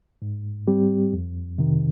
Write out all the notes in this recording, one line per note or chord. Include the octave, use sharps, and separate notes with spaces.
G#2
G3 C4 G4
F2
C3 D#3